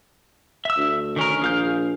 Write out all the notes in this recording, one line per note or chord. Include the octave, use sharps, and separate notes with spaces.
E5 E6
D2
D#3 C#4 A#4
A#1 G#4 F5 G6